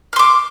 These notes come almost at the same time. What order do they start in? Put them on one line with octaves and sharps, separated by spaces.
F6 C6 D6